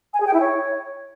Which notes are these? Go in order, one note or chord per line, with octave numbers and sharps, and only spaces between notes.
G#5
G#4
G5
E4
C#5